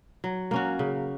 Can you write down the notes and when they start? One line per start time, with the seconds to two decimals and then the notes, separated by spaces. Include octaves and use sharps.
0.24 F#3
0.51 A#3 C#4 F#4
0.79 C#3